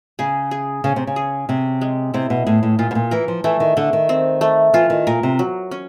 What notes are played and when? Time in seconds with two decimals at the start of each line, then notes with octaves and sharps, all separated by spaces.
0.19 C#3 G#4
0.51 G#4
0.84 C#3 C#4
0.96 C3
1.07 C#3
1.16 G#4
1.49 C3 C#4
1.81 G#3
2.14 C3 E4
2.30 B2
2.46 A2 G#4
2.63 A2
2.79 A#2 F4
2.91 B2
2.95 A#2
3.11 E3 A#4
3.28 F3
3.44 E3 A3
3.60 D#3
3.77 D3 A3
3.93 D#3
4.09 C4
4.41 A3
4.73 E3 F4
4.90 D#3
5.07 A#2 A#4
5.23 C3
5.39 F#3
5.71 C#4